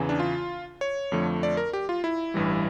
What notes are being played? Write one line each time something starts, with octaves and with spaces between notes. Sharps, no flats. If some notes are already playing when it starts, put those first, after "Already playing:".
Already playing: E2 C#3 E3
D4
F4
C#5
F2 D3 F3 A3
D5
A#4
G4
F4
E4
A1 G2 E3 G3